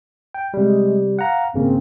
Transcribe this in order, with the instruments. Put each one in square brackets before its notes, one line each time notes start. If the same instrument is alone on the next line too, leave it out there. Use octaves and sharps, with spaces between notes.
[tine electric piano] G5
[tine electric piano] C3 G3 [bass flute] G#3
[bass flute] F5 [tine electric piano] F#5 A#5
[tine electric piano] G#1 C#3 A#3 [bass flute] C4